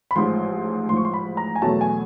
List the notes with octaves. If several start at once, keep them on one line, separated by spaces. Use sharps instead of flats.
B5
A1 G#2 F3 C6
A1 G#2 F3 C6
C#6
C6
B5
A#5
G#5
E2 B2 F#3 A3 A5
G#5